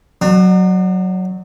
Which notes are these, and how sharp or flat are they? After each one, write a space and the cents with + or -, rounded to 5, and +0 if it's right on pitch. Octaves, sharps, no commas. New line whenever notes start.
F#3 +0 D4 +40